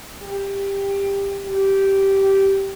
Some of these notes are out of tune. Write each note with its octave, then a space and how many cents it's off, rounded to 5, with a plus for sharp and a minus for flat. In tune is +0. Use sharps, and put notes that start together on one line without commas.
G4 +15
G4 -10